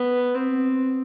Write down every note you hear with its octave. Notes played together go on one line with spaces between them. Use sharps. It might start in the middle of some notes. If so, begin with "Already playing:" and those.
Already playing: B3
C4